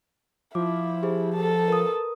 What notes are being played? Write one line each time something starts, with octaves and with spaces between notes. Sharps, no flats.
F3 E4 D6
G4 G#4 C5
A4 A5
A#4 B4 D#6